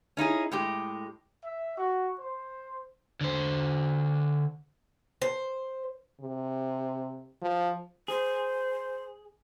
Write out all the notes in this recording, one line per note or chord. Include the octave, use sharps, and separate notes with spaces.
C#4 D#4 E4 G#4
A2 G#3 G4
E5
F#4
C5
D3 C5
C5
C3
F3
G#4 C5